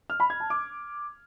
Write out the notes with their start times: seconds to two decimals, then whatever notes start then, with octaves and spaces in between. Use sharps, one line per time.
0.10 F6
0.20 B5
0.30 G#6
0.40 A5
0.50 D6